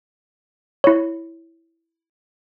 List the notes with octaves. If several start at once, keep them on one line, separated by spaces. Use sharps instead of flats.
E4 C#5